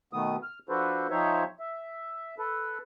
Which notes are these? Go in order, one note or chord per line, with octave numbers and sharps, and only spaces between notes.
B2 D#3 A3 B3 D#6
F6
F3 D4 F#4 A4 B4 C5
F3 C4 D#4 C5 C#5 E5
E5
A4 B4